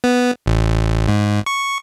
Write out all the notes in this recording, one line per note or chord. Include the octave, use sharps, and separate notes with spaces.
B3
A1
G#2
C#6